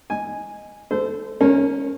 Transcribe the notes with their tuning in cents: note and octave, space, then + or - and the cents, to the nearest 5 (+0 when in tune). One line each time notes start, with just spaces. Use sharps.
D#5 +0 G#5 -5
A4 +0 C5 -25
C#4 +0 A#4 +0 C#5 -45